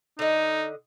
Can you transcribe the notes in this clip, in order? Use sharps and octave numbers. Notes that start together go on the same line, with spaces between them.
D3 D#4 D#5